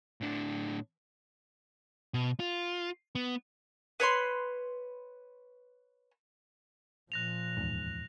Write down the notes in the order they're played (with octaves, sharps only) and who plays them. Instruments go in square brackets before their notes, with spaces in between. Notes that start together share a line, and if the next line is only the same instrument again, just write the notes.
[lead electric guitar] A2 D4
B2
F4
B3
[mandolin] B4 C#5 B5 C6
[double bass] A#2 F3 [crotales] F#6 A#6 F7
[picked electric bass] D1 E2 G#2